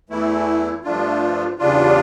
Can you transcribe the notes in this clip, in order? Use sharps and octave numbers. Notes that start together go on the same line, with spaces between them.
E2 E3 A3 E4
G2 F3 A3 D4 F4
E2 C#3 G3 D4 F4